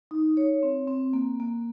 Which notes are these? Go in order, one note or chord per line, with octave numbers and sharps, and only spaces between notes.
D#4
C#5
C4
C4
A#3
A#3